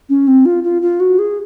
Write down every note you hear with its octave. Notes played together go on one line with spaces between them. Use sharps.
C#4
C4
F4
F4
F4
F#4
G#4